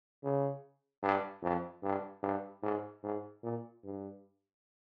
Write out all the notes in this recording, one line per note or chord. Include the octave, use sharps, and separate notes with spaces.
C#3
G2
F2
G2
G2
G#2
G#2
A#2
G2